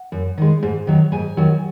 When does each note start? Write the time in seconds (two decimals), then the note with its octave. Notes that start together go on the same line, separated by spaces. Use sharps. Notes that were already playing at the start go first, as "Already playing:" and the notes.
Already playing: F#5
0.12 F#2
0.38 D#3 G#3
0.63 G#2
0.87 D#3 F#3
1.12 G#2 G#5
1.37 D#3 F#3